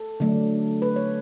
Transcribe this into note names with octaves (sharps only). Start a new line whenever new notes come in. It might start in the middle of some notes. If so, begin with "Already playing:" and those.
Already playing: A4
D3 F#3 A3 D4
B4
C#5